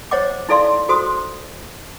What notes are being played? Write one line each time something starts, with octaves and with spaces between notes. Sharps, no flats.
C5 C#5 D#5 F#5 D6
D#4 E4 A4 D5 F5 C6
F#4 A4 C5 C6 D#6